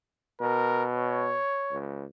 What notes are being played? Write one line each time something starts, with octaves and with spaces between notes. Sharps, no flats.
B2 A#4
C#5
C#2